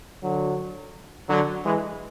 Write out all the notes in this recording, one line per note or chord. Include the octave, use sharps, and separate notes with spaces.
D3 F#3
D3 F#3
E3 G#3